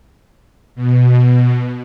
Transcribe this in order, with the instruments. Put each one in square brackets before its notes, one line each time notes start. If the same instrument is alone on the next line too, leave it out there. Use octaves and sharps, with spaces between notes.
[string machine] B2